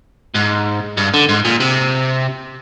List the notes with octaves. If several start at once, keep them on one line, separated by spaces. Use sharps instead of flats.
G#2
G2
D3
G#2
A#2
C3